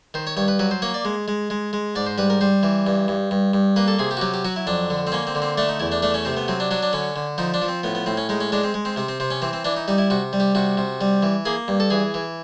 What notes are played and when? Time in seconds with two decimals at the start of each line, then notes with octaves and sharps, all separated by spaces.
0.14 D#3 C5
0.27 C#5
0.37 G2 C#5
0.48 B4
0.59 F#3 B4
0.71 C5
0.82 A#3 C#5
0.94 D5
1.05 G#3
1.28 G#3
1.50 G#3
1.73 G#3
1.95 G#2 D5
2.06 C5
2.18 G3 B4
2.30 A#4
2.41 G3 C5
2.63 E3
2.87 G2
3.08 G2
3.31 G2
3.53 G2
3.76 A#3 B4
3.88 A4
3.99 C3 G#4
4.11 G4
4.17 F#4
4.21 F#3 G4
4.34 G4
4.45 F#3 F#4
4.56 E4
4.67 F2 D4
4.90 D3
5.07 C4
5.12 A#3 C#4
5.27 C4
5.35 D3
5.42 C4
5.58 A3 D4
5.69 D#4
5.80 E2 E4
5.92 D4
6.02 A3 D4
6.14 C#4
6.25 C3 C4
6.37 B3
6.48 F#3 C4
6.60 D4
6.71 F#3 D4
6.83 D4
6.93 D3 C#4
7.16 D3
7.38 F3 D#4
7.54 D4
7.62 F3
7.68 C4
7.83 A2 B3
7.95 B3
8.06 A2 C4
8.17 C#4
8.29 G#3 D#4
8.41 C#4
8.52 G#3 D4
8.64 C4
8.74 G#3
8.85 C4
8.96 C3 C4
9.09 C4
9.20 C3 C4
9.31 C#4
9.42 E3 C4
9.53 C4
9.65 E3 D4
9.76 D#4
9.88 G3 D#4
9.98 E4
10.10 C3 F#4
10.33 G3
10.40 G4
10.55 C3 F#4
10.77 C3
11.01 G3
11.23 E3
11.45 A#3 G#4
11.68 G2
11.80 A4
11.90 E3 G#4
12.14 E3